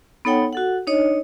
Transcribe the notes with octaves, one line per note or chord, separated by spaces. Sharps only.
B3 D#4 A4 C#5 F#5 G5
F#4 A4 F#5
D4 D#4 C#5 D#5